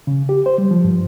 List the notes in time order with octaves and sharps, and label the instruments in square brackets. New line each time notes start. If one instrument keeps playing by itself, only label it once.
[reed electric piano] C#3
G4
C5
G3
F3
G2